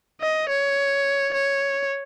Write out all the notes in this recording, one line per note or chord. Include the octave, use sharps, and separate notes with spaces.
D#5
C#5
C#5